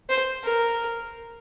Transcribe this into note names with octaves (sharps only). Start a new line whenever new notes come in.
C5
A#4